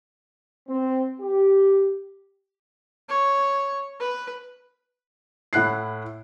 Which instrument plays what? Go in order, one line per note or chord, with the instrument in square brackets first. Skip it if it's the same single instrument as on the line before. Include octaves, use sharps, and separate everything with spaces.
[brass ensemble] C4
G4
[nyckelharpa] C#5
B4
[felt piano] A2 E4 F#5 F#6 C7